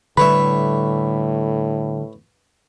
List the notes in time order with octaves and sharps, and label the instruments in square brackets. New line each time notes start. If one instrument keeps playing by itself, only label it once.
[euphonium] A2 [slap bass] D3 G3 [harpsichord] B4 C#5 E5 [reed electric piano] B5